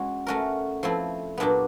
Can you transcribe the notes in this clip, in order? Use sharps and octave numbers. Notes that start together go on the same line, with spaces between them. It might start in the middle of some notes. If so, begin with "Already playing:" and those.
Already playing: G#3 C#4 F#4
A3 C#4 F#4 A#4
F3 A3 C4 E4
A#2 F#3 B3 D4 G4